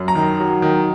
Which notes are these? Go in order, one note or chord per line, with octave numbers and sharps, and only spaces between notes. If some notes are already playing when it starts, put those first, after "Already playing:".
Already playing: F#2
A#5
D#3
F#3
D#3